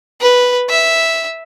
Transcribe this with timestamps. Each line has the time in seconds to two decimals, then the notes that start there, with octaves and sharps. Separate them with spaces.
0.21 B4
0.69 E5